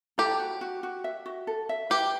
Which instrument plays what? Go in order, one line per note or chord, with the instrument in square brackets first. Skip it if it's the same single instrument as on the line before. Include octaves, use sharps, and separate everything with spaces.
[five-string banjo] G4 [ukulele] A4
[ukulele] F#4
F#4
F#4
E5
F#4
A4
E5
[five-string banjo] G4 [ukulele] B4